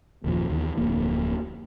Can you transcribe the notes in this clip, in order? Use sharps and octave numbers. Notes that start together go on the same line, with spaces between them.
F#1 D#2 A#2 F3
D#2 D#3 E3
D1 F2 D3 A#3